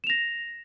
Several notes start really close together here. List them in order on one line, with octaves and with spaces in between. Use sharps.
E7 F7 A#6